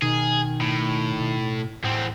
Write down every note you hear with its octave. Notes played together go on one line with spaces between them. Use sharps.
B2 D#3 G#4
A2
B2
E2 A2 C4